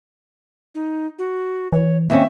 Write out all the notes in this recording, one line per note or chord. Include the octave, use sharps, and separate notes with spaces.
D#4
F#4
E3 C#5
D#2 C4 C#4 E5